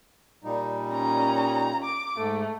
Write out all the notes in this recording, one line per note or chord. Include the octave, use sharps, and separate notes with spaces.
A#2 G3 D#4
C#4 A#5
D6
G#2 A3